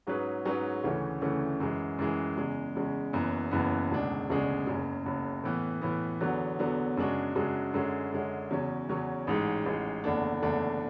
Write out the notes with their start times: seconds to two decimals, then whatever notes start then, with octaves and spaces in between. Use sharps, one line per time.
0.07 G#2 F#3 C#4 G#4 B4
0.45 G#2 F#3 C#4 G#4 B4
0.83 D2 C#3 E3 A3 C#4
1.21 D2 C#3 E3 A3 C#4
1.60 F#2 E3 G#3
1.99 F#2 E3 G#3
2.37 E2 C#3 G#3
2.75 E2 C#3 G#3
3.13 F#1 F#2 E3 B3
3.51 F#1 F#2 E3 B3
3.91 E1 D2 C#3 G#3 D4
4.29 E1 D2 C#3 G#3 D4
4.67 F#1 F#2 C#3
5.06 F#1 F#2 C#3
5.44 A2 E3 B3
5.82 A2 E3 B3
6.21 E2 D3 F#3 B3
6.59 E2 D3 F#3 B3
6.97 F#2 C#3 G#3 D4 F#4
7.35 F#2 C#3 G#3 D4 F#4
7.74 F#2 D3 G#3 C#4
8.12 F#2 D3 G#3 C#4
8.50 E2 C#3 F#3 C#4
8.89 E2 C#3 F#3 C#4
9.27 A1 G#2 G#3
9.66 A1 G#2 G#3
10.04 F#1 E2 D3 A3 D4
10.42 F#1 E2 D3 A3 D4